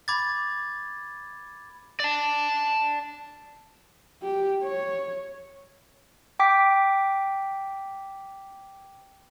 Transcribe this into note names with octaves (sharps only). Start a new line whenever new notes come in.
B5 D6 G#6 A6
D5 A5
G4
C#5
G5 D6 B6